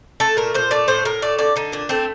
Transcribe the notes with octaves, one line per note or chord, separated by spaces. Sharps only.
A3 A4
A#2 A#4
A#2 C5
A3 D5
A2 C5
A2 A#4
A3 D5
D3 D5
D3 D#4
A#2 D4
A3 C4